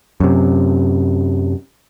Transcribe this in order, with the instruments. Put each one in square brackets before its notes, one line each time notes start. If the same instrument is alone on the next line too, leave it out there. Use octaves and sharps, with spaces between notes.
[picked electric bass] F#2 C3